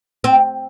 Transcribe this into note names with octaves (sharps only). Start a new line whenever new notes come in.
C4